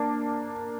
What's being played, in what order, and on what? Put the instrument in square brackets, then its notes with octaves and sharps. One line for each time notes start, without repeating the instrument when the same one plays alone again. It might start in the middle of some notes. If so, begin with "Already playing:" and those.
Already playing: [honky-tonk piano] A#3 D4